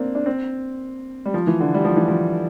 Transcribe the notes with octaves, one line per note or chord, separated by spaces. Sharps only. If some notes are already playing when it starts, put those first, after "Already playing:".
Already playing: A#3 C4 D4
D4
C4
G3
F3
E3
D3
G3
F3
E3
F3